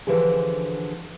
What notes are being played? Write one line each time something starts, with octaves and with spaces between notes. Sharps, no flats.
D3 E3 F3 G4 G#4